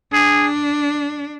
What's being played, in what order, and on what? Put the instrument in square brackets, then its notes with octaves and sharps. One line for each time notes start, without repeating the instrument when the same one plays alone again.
[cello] D4 [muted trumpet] G#4